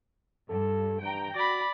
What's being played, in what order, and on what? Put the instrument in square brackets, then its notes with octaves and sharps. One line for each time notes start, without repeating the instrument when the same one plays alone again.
[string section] G2 [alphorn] A4
[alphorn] G2 [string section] G5 A#5
[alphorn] F#4 [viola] D5 B5 [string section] A#6